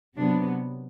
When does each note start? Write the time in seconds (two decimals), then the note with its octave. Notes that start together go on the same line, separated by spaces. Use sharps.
0.16 C3 F#3 B3 D4